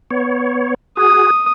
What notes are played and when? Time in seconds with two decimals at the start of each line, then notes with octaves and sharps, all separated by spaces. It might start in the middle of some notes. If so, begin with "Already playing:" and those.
0.11 B3 C#5
0.97 F#4 G#4 D#6